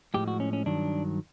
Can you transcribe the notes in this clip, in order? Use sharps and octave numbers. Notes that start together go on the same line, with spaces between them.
A2 F3 G#3 G4
F#4
C#4
C#4
G2 D#3 F#3 D4